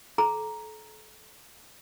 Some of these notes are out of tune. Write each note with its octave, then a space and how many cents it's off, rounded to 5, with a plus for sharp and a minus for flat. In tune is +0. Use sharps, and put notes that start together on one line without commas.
A4 -35 A#5 +0